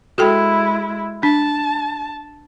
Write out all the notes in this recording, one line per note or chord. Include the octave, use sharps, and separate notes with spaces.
G#3 E4 F#4 A4 G5
D4 A5